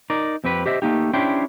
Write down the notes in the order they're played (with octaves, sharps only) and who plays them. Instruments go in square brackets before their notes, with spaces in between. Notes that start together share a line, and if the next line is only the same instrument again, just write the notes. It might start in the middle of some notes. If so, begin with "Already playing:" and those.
[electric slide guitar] D#4 A#4 D5
F2 C4 G4 B4
G4 C5 D#5 E5
A3 A#3 D#4 G4
C#4 D4 E4 G4 C5 G5